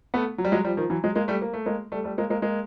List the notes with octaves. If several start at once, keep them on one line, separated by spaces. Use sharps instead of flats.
A3 B3
F#3
G3
F#3 G#3
F3 G3
D#3 F3
E3 F#3
F#3 G#3
G#3 A#3
G3 A3
A#3
A3
G#3 A#3
G3 A3
G3 A3
G#3 A#3
G#3 A#3
G#3 A#3